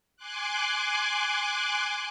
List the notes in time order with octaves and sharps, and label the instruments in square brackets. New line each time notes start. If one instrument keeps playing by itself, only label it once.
[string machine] G#5 C6 D6 F#6